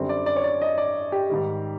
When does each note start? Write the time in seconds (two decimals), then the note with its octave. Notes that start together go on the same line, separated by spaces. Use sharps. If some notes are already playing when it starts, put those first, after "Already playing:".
Already playing: F#2 D3 G3 C4
0.09 D5
0.26 D5
0.36 C#5
0.44 D5
0.62 D#5
0.78 D5
1.12 G4
1.29 G#2 D#3 G3